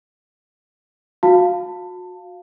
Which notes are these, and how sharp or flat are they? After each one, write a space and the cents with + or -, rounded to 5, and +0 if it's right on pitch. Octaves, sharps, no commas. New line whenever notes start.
F#4 -30 F5 +0 A5 +20